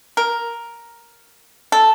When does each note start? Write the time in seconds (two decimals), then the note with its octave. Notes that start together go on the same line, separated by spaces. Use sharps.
0.17 A#4
1.72 A4